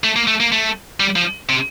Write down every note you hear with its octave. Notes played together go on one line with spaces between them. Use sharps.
A3
A#3
A3
A#3
A3
G3
F3
C3